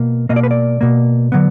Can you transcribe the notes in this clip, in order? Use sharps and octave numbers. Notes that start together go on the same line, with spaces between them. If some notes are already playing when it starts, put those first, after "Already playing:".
Already playing: B2 A#3
B2 A#3 D#5
D5
B4
D5
B2 A#3
D3 F#3 B3